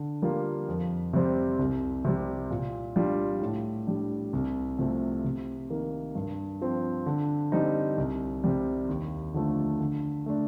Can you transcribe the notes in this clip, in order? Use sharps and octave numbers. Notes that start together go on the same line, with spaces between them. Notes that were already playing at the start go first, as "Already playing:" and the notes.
Already playing: D3
G3 A#3 F4
F2
C3 G3 C4
C2
C3 G3
A#2
G3 D4 F4
A2
G3 D4
C2
C3 F3 A3
C3
D#3 A#3
G2
F3 C4
D3
G3 C4 D#4
C2
C3 G3
D#2
D3 F3 A3
D3
A3 D4